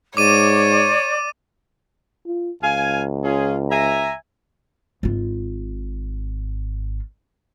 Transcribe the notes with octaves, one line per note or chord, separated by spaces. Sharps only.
G#2 C#5 D5 D6 D#7
F4
C#2 F5 G#5
C#4 F4 G#4
E5 G#5 A#5
G#1 F4